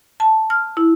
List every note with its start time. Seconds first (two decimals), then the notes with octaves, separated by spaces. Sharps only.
0.20 A5
0.50 F6
0.77 E4